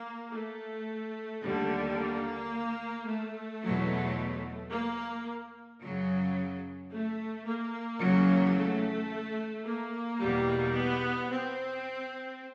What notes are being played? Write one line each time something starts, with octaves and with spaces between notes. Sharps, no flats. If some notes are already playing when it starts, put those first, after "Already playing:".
Already playing: A#3
A3
D#2 D3 G3
A#3
A3
E2 B2 F#3
A#3
F#2 C#3 F#3
A3
A#3
E2 C#3 F#3
A3
A#3
E2 B2 G3
B3
C4